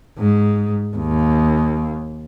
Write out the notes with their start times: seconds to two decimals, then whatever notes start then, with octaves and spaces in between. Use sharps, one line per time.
0.18 G#2
0.96 D#2